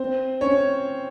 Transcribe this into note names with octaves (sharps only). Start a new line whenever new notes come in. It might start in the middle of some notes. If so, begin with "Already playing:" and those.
Already playing: C4 C5
C#4 C#5